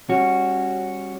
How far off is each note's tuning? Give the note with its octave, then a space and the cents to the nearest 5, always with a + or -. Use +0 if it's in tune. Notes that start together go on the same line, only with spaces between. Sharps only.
G3 +15 C#4 -20 F#4 +0